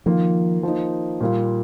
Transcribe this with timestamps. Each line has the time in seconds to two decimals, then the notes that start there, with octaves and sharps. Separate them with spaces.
0.06 D#3 F3 A#3 F4
0.63 F3 A#3 D#4
1.21 A#2 G3 A#3 F4